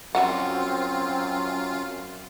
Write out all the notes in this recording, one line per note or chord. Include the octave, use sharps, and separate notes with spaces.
F#2 F3 F#3 C4 F4 F#5